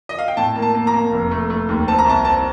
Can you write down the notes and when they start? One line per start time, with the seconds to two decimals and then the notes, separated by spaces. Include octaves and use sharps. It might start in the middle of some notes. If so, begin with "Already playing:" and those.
0.09 D#5
0.18 F5
0.28 G5
0.37 A2 A5
0.56 A#3
0.62 A5
0.75 A#3
0.87 A#5
0.94 A#3
1.12 F1
1.31 A3
1.50 A3
1.69 D#2
1.88 C4 A5
1.99 A#5
2.06 C2 A5
2.25 C4 A5